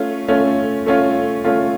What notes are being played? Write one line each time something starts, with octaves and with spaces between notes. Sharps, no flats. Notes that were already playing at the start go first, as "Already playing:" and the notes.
Already playing: A3 C#4 F4
A3 C#4 F4
A3 C#4 F4
A3 C#4 F4